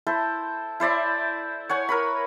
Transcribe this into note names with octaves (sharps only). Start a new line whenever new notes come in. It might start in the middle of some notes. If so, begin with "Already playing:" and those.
E4 A4 C5
E4 C5 D5 E5
C#5 F#5 G#5
A#4 B4 B5